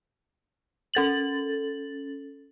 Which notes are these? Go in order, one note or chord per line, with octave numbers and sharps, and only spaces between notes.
C#4 A4 A6 F#7